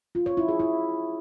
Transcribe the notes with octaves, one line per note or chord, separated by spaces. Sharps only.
F4
C#5
E4
G#4
E4